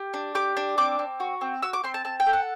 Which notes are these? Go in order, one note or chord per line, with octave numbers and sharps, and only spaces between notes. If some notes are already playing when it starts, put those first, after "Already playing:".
Already playing: G4
D4
G4 D6
D4
C4 D6
C4
F#4
C4
F#4 E6
D6
C4 C6
A5
C4 A5
G5
A4
F#5